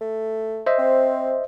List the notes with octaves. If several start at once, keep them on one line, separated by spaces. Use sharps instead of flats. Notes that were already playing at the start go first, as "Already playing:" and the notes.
A3
C5 D#5 E5
C4